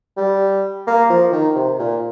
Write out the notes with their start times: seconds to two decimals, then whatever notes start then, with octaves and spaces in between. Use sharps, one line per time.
0.17 G3
0.87 A#3
1.10 F3
1.32 D#3
1.55 C3
1.79 A#2